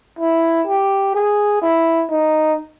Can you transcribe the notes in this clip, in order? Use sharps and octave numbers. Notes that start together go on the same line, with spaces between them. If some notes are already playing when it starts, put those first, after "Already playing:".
E4
G4
G#4
E4
D#4